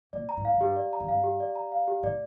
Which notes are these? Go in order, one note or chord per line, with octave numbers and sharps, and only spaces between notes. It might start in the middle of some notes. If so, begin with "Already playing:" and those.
A#2 D5
A#5
A2
F5
A2
G2 G4
D5
A#5
F2
G2 F5
G4
D5
A#5
F5
G4
A2 D5